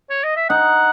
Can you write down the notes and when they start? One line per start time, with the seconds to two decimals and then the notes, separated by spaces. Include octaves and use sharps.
0.10 C#5
0.24 D#5
0.36 E5
0.49 D#4 F#5